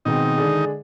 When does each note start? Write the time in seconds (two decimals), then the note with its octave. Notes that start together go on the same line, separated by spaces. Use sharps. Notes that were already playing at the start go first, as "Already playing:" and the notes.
0.05 B2 D#3 G#3 C4 D#4
0.37 D3 G#3 D4 G#4